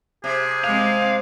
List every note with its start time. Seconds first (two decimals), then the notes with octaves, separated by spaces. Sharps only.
0.24 C3 G#4
0.64 G#3 C4 F5